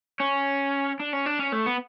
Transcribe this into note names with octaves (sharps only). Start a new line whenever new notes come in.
C#4
D4
C#4
D4
C#4
A3
B3